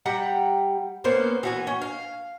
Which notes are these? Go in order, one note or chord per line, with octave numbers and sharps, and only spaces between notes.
G3 F#5 G5 A#5
A#3 B3 C#4 C5
E3 F#4 G#5
C#4
F5